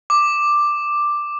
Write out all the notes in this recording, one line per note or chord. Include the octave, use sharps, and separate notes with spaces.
D6